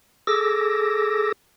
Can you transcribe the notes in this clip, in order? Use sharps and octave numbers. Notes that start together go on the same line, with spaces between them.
G#4 A4 D6 E6 A#6